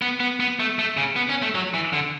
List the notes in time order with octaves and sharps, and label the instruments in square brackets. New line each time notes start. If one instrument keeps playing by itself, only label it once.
[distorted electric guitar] B3
B3
B3
A3
A3
C#3
B3
C#4
A3
F#3
E3
D3